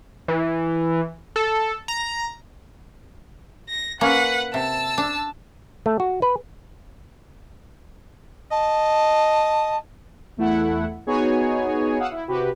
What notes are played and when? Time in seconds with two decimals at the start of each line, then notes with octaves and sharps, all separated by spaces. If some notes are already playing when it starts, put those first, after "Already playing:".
0.28 E3
1.36 A4
1.88 A#5
3.69 A#6
4.01 A#3 C#4 B4 F#5
4.54 C3 A5 E6
4.98 D4
5.86 A3
6.00 F#4
6.22 B4
8.51 D#5 A5
10.37 E2 A3 E4 F#5
11.07 B3 D#4 F#4 G#4 C#5 G#5
11.99 F5 F#5 D#6 E6
12.11 E4
12.28 C3 F#4 G4 B4